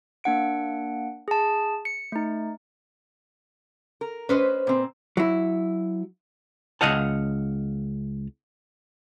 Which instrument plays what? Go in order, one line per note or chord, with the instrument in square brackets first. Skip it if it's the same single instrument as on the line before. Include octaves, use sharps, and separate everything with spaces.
[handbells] A#3 D4 F#5 D7
G#4 A5
C#7
A3 D#4
[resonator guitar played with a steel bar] A#4
[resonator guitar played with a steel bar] C#4 [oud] B4 C5 D#5
[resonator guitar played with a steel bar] A#2 C4
[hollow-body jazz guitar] F#3 E4
C#2 C#3 D#5 F5 F#5 A5